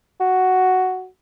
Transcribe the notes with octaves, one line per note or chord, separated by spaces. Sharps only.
F#4